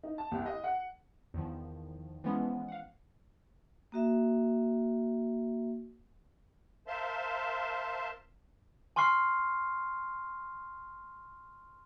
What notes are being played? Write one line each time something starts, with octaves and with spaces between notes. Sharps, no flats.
D#4
A5
C2
D#5
F#5
E2 D#3 F3
E3 F3 G#3 B3 C#4
F5 F#5
A#3 F#4 E5
A#4 C5 E5 F5 A5 C6
G#5 C6 C#6 F6 C7